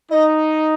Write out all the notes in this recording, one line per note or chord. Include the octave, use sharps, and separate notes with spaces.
D#4 D#5